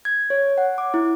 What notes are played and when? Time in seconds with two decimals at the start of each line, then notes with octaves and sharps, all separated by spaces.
0.05 G#6
0.30 C#5
0.58 F#5
0.78 D6
0.94 E4